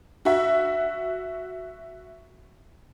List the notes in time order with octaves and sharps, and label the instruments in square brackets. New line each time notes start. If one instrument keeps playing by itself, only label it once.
[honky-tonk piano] F#4 E5